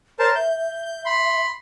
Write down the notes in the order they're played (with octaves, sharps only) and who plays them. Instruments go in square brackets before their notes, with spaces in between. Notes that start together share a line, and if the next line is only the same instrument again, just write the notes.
[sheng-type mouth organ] A#4 C5 A5 [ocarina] C#5
[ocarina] E5 [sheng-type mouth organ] G6
[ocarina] E5
[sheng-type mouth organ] B5 C6